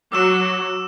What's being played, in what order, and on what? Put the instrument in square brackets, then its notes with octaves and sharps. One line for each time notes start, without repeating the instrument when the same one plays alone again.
[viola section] F#3 F#4 [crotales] D6 E6 E7